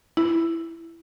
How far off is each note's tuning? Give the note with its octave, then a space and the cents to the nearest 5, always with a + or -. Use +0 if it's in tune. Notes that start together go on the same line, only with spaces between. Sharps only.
E4 +10